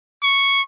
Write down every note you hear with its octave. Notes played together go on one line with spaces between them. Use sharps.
C#6